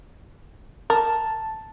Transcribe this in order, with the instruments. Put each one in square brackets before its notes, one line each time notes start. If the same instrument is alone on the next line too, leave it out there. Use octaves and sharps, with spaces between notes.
[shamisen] A#4 [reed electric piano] A5